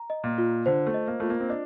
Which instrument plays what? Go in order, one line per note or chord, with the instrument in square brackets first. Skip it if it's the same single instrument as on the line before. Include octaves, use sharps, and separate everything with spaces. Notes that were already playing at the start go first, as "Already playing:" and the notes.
Already playing: [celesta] A#5
D#5
[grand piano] A#2
[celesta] F4
[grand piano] D3 [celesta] C5
[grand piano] A3
[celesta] D#5
[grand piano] A#3
[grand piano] A3 [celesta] F4
[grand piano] A#3
C4
[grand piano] D4 [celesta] D#5